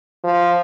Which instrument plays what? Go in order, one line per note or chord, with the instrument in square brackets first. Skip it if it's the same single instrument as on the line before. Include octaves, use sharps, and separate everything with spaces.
[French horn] F3